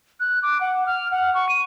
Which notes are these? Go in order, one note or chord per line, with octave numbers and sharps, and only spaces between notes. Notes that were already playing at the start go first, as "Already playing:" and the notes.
F#6
D6
F#5
F6
F#5
C#6
D#7